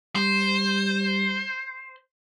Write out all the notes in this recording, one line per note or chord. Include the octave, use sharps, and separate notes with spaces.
G3 C5